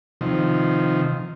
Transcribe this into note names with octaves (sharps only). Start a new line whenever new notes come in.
C3 D#3 F3